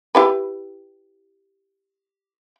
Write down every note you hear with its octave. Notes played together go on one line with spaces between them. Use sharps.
E4 G4 B4